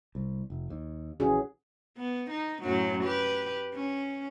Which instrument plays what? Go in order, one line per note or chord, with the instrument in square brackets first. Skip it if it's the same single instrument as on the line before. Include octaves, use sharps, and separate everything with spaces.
[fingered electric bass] C2
F1
D#2
[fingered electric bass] A#1 E3 [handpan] C#4 F#4 G#4
[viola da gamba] B3
D#4
F#2 A2 F#3
G4 B4
C#4